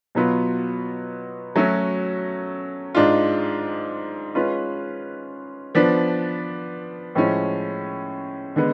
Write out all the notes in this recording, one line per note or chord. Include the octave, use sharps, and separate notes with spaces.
B2 F#3 B3 F4
F#3 A3 C#4 F#4
G#2 G#3 D4 F4
G#3 C#4 F4 B4
F3 B3 D4
A2 F3 G#3 C#4
D3 G#3 B3